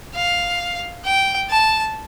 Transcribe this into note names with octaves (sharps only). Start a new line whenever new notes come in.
F5
G5
A5